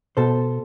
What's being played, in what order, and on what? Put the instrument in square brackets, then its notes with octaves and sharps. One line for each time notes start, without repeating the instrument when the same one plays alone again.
[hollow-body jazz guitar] B2 A4 C5